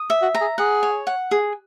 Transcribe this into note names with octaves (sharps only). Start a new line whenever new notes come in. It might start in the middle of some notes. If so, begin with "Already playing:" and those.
Already playing: D#6
E5
F#4
A#5
G#4
G#4 F#5
C#5
F#5
G#4